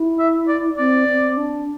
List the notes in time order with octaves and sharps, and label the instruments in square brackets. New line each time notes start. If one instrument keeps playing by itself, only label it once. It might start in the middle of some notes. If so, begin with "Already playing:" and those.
Already playing: [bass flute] E4
[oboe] E5
D5
[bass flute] C4 [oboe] D5
[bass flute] C4
D4